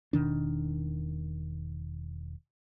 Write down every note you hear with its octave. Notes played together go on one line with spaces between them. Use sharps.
E1 B2 D#3 D4